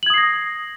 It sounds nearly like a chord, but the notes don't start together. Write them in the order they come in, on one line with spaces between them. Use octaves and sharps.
F#7 G#6 D#6 C7 A#6